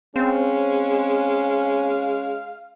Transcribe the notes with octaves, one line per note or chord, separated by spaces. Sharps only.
G#3 C4 C#4 F5